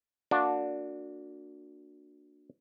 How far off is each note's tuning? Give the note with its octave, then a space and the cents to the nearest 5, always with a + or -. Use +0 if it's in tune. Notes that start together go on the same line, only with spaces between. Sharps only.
A#3 -30 D4 +0 F#4 -25